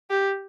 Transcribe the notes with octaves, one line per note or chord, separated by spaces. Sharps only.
G4